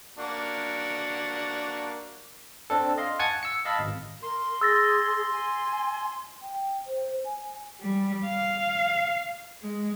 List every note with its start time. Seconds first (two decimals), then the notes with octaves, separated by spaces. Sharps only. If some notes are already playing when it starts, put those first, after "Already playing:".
0.18 A#3 D4 F#4
2.70 C4 D4 A4
2.98 D#5 F5 C6
3.19 F#5 G#5 A5 C#6 G#6 C#7
3.43 E6 C#7
3.65 D#5 F5 A5 B5 E6
3.79 G#1
4.23 A#4 C6
4.61 G#4 E6 A6 A#6
5.32 G#5
6.42 G5
6.87 C5
7.25 G#5
7.81 G3
8.26 F5
9.63 G#3